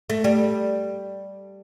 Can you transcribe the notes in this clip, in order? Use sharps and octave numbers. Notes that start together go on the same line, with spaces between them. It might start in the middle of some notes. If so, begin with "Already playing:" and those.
A3
G3